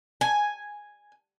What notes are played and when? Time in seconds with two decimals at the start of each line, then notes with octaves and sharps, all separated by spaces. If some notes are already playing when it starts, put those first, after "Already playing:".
0.21 G#5